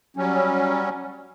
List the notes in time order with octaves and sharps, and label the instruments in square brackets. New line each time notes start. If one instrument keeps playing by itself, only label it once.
[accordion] F#3 G3 C#4